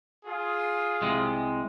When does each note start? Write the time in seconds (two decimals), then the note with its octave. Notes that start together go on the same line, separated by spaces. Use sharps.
0.25 F4 G#4
1.02 C2 C3 G#3